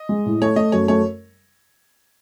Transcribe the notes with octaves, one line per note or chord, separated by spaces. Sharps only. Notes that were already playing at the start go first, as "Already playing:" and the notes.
Already playing: D#5
G#3
A2
A3 C#5
A3 D#5
F#2 C#5
A3 C#5